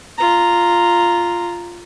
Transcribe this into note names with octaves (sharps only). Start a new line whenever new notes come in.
F4 A#5